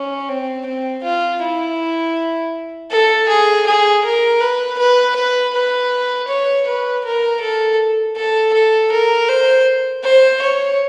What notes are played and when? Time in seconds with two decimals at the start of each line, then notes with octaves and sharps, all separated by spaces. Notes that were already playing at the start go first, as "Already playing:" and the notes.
Already playing: C#4
0.29 C4
0.66 C4
1.04 F4
1.42 E4
2.91 A4
3.29 G#4
3.67 G#4
4.05 A#4
4.41 B4
4.78 B4
5.16 B4
5.53 B4
6.29 C#5
6.67 B4
7.05 A#4
7.41 A4
8.16 A4
8.54 A4
8.92 A#4
9.29 C5
10.04 C5
10.42 C#5